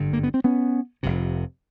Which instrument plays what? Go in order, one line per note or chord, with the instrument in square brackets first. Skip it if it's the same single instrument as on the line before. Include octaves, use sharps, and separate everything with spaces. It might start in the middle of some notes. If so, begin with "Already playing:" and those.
Already playing: [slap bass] G#1 G2 D3
A#3
B3
C4
B3 C#4
F1 F2 C3